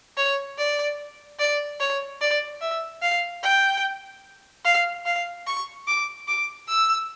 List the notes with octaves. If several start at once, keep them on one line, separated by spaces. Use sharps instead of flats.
C#5
D5
D5
C#5
D5
E5
F5
G5
F5
F5
C#6
D6
D6
E6